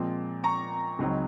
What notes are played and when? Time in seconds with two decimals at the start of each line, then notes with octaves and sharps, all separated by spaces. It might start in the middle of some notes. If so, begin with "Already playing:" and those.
Already playing: A#2 F3 G#3 C4
0.44 A#5 C#6
0.99 C#2 C#3 F#3 C4 D#4